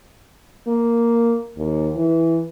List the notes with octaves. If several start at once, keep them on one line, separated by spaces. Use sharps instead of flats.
A#3
D#2
E3